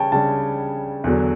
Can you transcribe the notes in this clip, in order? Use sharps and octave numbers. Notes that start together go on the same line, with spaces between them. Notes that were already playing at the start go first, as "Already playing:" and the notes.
Already playing: C#3 G3 C#5 G5 A5
C#3 G3 D4 A5
E2 D3 F#3